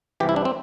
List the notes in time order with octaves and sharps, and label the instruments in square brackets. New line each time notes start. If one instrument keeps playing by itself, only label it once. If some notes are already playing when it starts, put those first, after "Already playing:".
[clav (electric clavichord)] C2 C3 E3 G4
E4
D4
C4